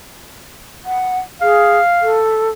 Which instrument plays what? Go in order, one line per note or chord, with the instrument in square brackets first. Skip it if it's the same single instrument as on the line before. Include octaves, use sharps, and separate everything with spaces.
[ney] F#5
[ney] G#4 [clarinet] F5
[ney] A4